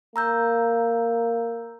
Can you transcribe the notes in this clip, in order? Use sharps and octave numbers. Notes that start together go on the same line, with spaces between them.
A#3 A#5 E6 G6